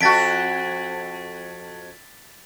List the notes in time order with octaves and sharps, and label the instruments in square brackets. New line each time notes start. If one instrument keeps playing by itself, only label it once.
[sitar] F2 F#4 [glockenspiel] A6 B6 D7